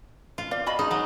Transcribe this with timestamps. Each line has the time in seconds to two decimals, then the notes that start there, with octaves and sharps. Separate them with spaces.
0.38 F4
0.51 D5 F5
0.66 F#4 D#5 B5
0.79 D#4 G#4
0.91 F#3 G#3